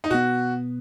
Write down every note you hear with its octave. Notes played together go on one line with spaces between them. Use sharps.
D#4
B2 B3 F#4